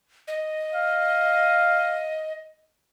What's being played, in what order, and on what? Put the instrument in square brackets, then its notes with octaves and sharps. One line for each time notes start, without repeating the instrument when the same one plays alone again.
[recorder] D#5
[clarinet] F5